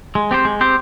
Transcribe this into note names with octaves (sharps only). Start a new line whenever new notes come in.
G#3
C4 G4 C5
G#3
C4 G4 C5